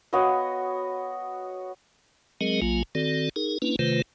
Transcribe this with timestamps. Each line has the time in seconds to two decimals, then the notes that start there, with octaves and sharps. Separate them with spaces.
0.13 B3 F#4 C#5 D#5
2.41 F#3 G#3 C4 G#4 A#4 D#5
2.62 A#1 F#3 A#3 F4 G#5
2.95 D#3 C4 F#4 A4 D5
3.36 D#4 G#4 A#4
3.62 A#3 C#4 D4 E4 B4
3.79 C3 D#3 A3 F4 B4 C5